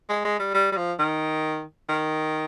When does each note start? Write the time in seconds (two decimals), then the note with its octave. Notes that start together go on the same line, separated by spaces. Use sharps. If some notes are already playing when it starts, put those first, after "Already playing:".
0.10 G#3
0.25 G#3
0.40 G3
0.54 G3
0.72 G3
0.77 F3
0.99 D#3
1.89 D#3